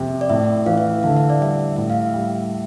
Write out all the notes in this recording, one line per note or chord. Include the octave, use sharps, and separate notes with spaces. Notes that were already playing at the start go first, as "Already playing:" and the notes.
Already playing: F2 C3
D5
A2 E5
E3 F5
E5
F5
D3 F5
E5
D5
G3 E5
A2 E5
F5
E5
G3